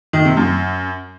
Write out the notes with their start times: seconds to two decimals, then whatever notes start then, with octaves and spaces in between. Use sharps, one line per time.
0.13 D#3
0.25 C3
0.37 F#2